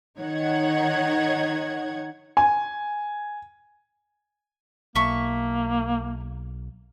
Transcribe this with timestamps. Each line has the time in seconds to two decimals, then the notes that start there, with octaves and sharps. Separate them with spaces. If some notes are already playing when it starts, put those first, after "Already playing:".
0.19 D#3 D#4 C#5 F#5 G#6
2.37 G#5
4.96 B1 A#3 E5 A5 C#6